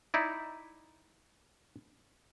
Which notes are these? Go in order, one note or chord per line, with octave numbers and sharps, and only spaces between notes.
D#4 E4 D5